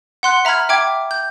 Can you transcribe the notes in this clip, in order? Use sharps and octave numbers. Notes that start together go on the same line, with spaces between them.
F#5 C6 F#6
E5 A#5 B5 F6 G#6
E5 G5 D6 G#6
G6